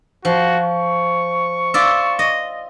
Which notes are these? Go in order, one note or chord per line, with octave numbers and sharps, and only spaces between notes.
F3 F#4
C#6
F4 D5 E5
D#5